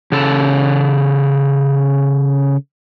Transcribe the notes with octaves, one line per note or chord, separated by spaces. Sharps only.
C#3 A4